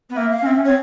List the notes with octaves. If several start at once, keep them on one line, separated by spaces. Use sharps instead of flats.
B3
A#3 E5
F5
C#4
C4 E5
C#4
C4 C#5